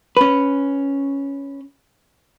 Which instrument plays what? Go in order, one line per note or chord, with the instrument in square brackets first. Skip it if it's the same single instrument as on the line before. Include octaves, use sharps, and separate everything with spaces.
[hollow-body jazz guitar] C#4 B4